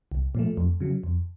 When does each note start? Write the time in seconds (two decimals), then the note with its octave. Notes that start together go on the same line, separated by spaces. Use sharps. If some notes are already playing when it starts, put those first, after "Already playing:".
0.12 C2
0.35 A#2 F3 A3
0.57 F2
0.80 C#3 F#3
1.04 F2